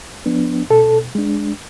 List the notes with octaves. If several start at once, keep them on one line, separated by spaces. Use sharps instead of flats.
F3 B3 D4
B2 A4
G#3 D4